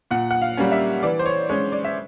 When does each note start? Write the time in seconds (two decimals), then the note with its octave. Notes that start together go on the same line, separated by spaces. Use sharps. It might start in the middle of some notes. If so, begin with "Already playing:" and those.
0.11 A#2 F#5
0.31 F#5
0.42 F5
0.57 G3 A#3 C#4
0.72 E5
1.03 E3 D5
1.19 C5
1.26 C#5
1.49 G#3 C#4 C#5
1.72 D5
1.84 E5